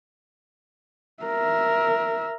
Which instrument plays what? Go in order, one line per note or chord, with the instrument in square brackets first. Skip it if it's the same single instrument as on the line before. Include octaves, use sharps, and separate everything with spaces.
[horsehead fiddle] A#4 E5